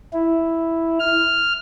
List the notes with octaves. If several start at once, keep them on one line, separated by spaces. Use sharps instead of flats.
E4
F6